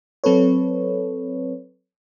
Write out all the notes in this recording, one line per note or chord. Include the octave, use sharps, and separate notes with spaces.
F#3 C4 A4 B4 C#5